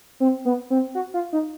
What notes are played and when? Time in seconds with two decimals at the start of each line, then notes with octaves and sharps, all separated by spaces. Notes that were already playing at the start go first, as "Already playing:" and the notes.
0.20 C4
0.45 B3
0.70 C4
0.95 F#4
1.14 F4
1.33 D#4